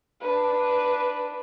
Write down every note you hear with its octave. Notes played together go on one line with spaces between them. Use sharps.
D4 B4